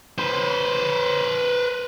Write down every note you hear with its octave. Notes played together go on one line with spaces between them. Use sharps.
B4 C5